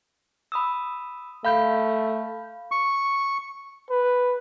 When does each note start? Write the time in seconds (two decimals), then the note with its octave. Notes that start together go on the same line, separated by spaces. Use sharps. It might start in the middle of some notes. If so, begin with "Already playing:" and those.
0.52 B5 D#6 E6
1.45 A3 F5 B5 G6
2.72 C#6
3.90 B4